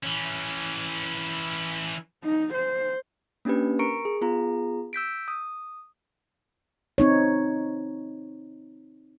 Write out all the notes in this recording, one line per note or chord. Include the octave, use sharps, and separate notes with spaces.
E3 C#4
D#4
C5
A#3 C#4 D4 G4 B4
A#4 A#5 C#6 C#7 D7
G#4
B3 F4 G#4 A#5
E6 G6 B6 D7
D#6
C4 D#4 C#5